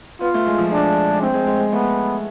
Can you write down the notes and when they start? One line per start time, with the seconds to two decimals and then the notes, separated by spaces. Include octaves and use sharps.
0.21 B3 F4
0.34 A3
0.47 G#3
0.58 F3
0.71 G#3 D4
1.11 G#3
1.21 A3 C4
1.34 G#3
1.47 G#3
1.59 G#3
1.72 A3 B3